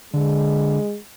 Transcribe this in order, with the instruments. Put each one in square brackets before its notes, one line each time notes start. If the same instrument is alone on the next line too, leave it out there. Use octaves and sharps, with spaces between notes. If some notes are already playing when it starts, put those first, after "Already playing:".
[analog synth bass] D3 [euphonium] G#3